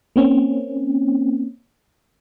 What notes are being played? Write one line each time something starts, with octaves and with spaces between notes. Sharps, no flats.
A#3 C4 C#4